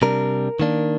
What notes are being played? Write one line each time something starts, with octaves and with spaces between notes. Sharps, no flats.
C3 G3 D4 A#4
D#3 A#3 D4